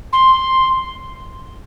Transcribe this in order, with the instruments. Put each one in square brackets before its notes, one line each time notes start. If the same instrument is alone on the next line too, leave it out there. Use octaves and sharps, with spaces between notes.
[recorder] C6